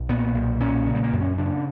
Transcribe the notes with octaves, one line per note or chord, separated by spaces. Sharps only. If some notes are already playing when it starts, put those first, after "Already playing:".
Already playing: B1
A#2 B3
B1
A#2 C#4
C#3
G3
A#3
F#2
C#4
C#3 D4